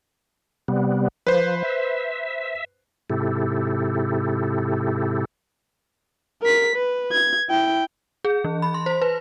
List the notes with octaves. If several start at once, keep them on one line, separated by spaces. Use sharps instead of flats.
C3 G3 B3
F3 B4 C5
E5
G#2 C3 E4 G4 A4
A#4 B6
B4
G#6
E4 G5
G#4
E3
B5
C6
C5
B4